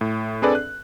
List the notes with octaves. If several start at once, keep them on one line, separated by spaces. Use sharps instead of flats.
A2
C4 D4 G#4 A4 B4 D5
F#6